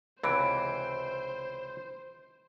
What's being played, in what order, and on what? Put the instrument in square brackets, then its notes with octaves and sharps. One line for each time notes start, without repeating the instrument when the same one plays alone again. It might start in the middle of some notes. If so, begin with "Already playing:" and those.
[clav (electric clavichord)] C#2 C3 E3 [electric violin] C5 [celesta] B5 D7